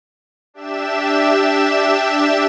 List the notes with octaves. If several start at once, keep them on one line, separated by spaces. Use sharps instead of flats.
D4 G4 E5 E7